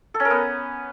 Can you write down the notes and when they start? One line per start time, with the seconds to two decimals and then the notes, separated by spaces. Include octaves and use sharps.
0.14 A4
0.20 C#4
0.25 A#4
0.31 B3